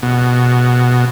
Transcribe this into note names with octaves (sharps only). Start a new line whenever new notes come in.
B2